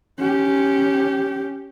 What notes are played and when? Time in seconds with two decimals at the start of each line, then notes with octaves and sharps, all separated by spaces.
0.20 C#4 G4